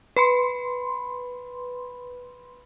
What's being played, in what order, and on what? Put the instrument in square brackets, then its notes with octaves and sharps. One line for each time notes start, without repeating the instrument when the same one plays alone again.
[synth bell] B4 B5 C6